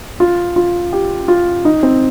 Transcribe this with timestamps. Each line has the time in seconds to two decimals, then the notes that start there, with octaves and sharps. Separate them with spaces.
0.20 F4
0.56 F4
0.93 G4
1.28 F4
1.65 D#4
1.83 C4